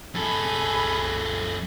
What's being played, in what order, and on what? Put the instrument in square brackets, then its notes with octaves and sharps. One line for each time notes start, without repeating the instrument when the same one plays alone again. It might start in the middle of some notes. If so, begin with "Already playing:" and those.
[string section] C2 G#4 B5 [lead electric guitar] F#2 A4